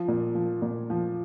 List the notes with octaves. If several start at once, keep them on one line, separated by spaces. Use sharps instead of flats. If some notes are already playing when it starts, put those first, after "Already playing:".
Already playing: F3
A#2
F3
A#2
F3